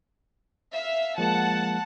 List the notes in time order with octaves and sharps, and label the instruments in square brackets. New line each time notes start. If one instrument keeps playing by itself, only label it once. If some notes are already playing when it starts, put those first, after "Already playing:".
[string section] E5 F5
[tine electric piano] F3 G#3 A#3 [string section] F#5 A5